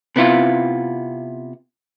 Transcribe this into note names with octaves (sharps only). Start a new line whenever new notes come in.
C3 B3 E4 F4